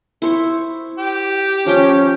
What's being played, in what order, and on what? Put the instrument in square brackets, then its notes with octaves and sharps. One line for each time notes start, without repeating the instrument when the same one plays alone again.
[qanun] E4 C5 C#6
[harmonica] G4
[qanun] F3 F4 G5 [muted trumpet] C#4